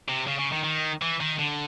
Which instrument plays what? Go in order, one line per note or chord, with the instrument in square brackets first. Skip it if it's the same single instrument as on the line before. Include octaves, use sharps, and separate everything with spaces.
[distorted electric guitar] C3
C#3
C#3
D#3
D#3
E3
D#3
D3